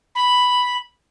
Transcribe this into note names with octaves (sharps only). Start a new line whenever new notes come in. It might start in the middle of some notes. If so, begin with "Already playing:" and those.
B5